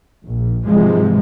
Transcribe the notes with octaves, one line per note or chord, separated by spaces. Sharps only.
A#1
G#2 C3 E3 F3 G#3